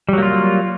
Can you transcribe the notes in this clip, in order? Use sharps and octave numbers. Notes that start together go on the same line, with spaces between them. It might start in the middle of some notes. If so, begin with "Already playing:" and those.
F#3 G3 A#3 F4